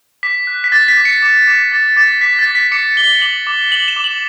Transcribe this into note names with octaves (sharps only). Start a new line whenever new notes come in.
D6 B6
F#6
B6
D6 A6
B6
D6
C#7
D6
D6
D6 A6
D6 A6
D6 B6
A6
D6
B6
D6 C#7
D6 G7
D6 F#7
D6
D6 F#7
E7
D6
F#7